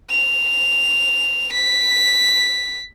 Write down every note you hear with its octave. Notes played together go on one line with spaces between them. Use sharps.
F7
B6